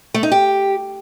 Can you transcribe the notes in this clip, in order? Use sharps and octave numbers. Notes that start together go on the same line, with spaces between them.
A3
D#4
G4